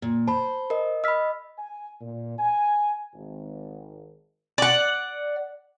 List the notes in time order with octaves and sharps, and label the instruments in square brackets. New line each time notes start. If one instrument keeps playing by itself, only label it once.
[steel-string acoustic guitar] A#2
[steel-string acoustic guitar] C5 [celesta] A5 B5
[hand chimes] A#4 D#5
[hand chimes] D#5 B5 [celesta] E6 F6 B6
[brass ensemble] G#5
A#2
G#5
G#1
[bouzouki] D5 F#5